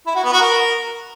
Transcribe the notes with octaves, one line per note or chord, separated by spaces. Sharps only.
E4
F#4
B3
F#4
A#4